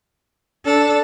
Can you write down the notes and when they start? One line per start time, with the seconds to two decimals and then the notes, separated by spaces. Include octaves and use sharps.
0.66 D4 A4